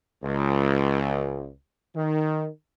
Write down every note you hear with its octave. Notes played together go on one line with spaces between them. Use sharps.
C#2
D#3